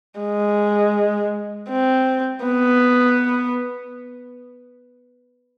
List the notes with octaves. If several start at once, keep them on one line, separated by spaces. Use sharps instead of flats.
G#3
C4
B3